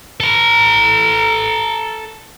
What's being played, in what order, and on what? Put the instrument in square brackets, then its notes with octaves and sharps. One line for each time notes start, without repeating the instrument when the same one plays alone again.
[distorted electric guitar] A4 A#5